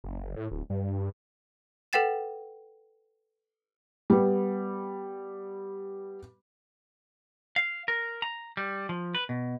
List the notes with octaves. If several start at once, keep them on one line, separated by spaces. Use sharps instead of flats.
F#1
A2
D1
G2
A4 B4 F#5 G5 A6 E7
G3 B3
F5
A#4
A#5
G3
F3
B4
B2